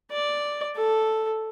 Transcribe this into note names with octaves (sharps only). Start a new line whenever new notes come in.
D5
A4